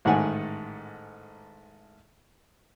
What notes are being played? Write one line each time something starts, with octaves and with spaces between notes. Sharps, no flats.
A1 G#2 D#3 A3 F#5 G#5